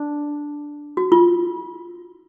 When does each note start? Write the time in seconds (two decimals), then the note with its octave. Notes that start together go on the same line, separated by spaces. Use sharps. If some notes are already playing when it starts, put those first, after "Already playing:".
Already playing: D4
0.97 F#4
1.12 F4